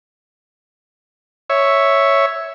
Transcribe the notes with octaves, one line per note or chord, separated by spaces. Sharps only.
C#5 E5